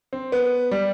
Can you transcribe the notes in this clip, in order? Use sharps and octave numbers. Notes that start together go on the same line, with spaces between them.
C4
B3
G3